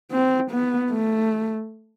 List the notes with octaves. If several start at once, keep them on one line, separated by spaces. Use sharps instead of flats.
C4
B3
A3